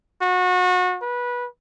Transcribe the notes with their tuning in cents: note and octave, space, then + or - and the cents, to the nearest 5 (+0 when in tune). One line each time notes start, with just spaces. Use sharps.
F#4 -30
B4 -20